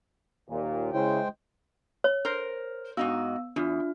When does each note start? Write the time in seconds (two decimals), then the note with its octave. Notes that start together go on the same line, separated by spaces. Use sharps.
0.49 D#2 A#2
0.93 C#3 G#3 C#4 E4 C5 G5
2.04 C#5
2.25 A#4 C5
2.97 G#2 B3 D#4 F#4 F5 E6
3.56 E2 D4 F4 F6